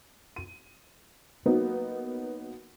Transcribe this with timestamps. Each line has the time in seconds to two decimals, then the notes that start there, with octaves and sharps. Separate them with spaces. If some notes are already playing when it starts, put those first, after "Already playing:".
0.36 D#7
1.46 F#3 A#3 B3 D#4